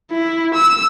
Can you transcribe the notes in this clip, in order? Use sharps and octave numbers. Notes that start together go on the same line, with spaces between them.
E4
E6